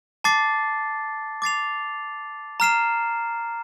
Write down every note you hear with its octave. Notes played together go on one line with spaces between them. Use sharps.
A5 D6 A6 C7
D6 A6 C7 F7
A#5 F6 C7 E7